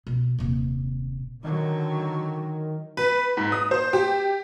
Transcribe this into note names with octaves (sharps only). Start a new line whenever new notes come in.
B2
D#1 C3
D3 D#3 F#3
B4
G#2
D#6
C5
G4